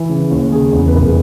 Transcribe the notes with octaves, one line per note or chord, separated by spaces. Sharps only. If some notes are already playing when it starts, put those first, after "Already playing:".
Already playing: E3
C#3
D#2
C#3 G#4
E2
B4
F1 A#4
G#4